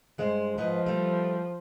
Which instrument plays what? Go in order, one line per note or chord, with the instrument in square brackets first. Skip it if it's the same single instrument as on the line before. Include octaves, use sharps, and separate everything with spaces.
[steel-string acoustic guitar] G2 G#3 C5
[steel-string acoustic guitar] G#2 B4 D#5 [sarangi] F3
[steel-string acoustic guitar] G3 A3